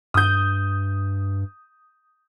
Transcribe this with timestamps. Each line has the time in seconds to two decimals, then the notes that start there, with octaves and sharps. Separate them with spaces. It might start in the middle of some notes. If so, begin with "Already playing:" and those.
0.14 G2 D#6 G6